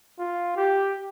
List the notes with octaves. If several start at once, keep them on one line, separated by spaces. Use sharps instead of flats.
F4
G4